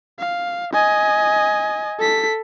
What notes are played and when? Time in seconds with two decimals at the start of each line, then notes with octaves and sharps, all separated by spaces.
0.19 F5
0.74 D#5 G#5
1.99 A4 B6